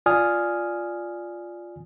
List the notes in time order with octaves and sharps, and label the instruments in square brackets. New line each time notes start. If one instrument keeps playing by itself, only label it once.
[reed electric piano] F4 D5 G#5 D#6 F6